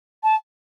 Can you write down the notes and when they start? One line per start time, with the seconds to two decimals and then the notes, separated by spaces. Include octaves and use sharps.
0.23 A5